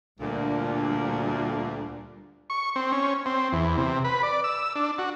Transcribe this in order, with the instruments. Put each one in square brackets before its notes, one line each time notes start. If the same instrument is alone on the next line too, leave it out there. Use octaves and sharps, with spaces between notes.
[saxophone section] D2 A#2 [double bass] G3 D4
[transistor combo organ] C#6
C4
C#4
C4
E2
C3
B4
D5
E6
D4
F#4